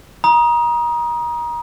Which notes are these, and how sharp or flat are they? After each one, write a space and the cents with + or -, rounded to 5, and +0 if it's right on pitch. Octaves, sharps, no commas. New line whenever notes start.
A#5 +30 D#6 +0